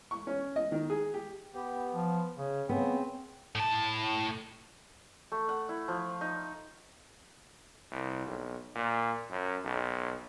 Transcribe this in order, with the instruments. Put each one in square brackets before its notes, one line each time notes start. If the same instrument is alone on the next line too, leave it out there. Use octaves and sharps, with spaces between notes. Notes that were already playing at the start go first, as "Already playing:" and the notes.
[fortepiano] C#6
C#4
D#5
D#3
G#4
G4
[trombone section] B3 [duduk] G4
[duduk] F3
C#3
[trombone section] C#3 [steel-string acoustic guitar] B3 [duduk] C4
[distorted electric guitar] A2 A5
[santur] A3
F#5
E4
F3
D#4
[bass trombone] C2
B1
A#2
F#2
B1